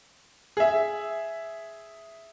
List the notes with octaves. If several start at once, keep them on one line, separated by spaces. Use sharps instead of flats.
G#4 E5